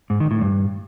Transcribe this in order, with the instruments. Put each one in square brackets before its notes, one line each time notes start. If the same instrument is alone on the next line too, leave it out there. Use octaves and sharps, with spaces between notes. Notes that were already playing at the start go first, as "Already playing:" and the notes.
[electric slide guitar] G#2
D#3
A2
G2